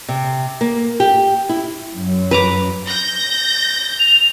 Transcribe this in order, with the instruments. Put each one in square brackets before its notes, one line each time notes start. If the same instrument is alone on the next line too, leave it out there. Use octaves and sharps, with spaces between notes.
[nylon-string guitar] C3
A#3
G4
E4
[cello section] F#2
[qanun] B4 A#5 D6
[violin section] G6 A#6
[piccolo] F7